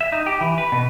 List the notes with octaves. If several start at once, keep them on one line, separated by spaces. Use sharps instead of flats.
E5
D#4
G4
E3
B4
B2